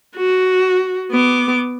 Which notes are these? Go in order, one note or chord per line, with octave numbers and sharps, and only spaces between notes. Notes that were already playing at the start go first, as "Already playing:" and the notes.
F#4
B3 D6